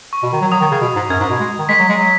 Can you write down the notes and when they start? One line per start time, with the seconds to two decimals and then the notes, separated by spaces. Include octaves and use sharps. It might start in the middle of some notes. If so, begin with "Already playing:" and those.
0.13 C#6
0.23 B2
0.33 D#3
0.41 F#3
0.51 F#3 D#6
0.61 D#3
0.71 C#3
0.81 B2
0.96 G#2
1.10 F#2 G#6
1.20 G#2
1.30 B2
1.40 G#3
1.59 D#3
1.69 G#3 B6
1.79 F#3
1.89 G#3
1.98 F#3